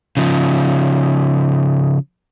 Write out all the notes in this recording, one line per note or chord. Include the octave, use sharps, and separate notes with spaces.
C#3 F3